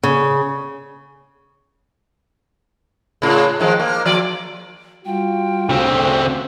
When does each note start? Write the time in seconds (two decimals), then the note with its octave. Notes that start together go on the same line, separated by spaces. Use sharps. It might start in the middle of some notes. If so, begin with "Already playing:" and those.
0.03 C#3
3.22 A2 C#3
3.60 D#3 F3 G#3
3.80 A#3
4.05 F3 D5
5.05 G3 F4 F#4 G5
5.69 D2 C#3 C4